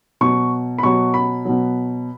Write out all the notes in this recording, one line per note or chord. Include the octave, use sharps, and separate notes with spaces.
B2 F#3 C#6
B5
B2 F#3 C#6
B5
B2 F#3